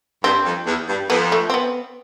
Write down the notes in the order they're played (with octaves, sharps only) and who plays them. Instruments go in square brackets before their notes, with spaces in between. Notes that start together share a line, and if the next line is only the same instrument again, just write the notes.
[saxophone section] G2 [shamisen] C4
[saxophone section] F2
E2
G2
[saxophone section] F2 [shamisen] B3
[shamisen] A3
C4
B3